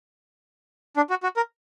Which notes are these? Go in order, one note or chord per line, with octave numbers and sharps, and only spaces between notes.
D4
F#4
F#4
A#4